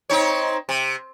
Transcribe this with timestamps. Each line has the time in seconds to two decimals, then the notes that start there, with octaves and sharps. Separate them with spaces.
0.10 C4 D#4 C#5
0.69 C3